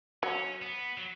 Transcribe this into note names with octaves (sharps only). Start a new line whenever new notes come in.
F#3 C#4
B3
F#3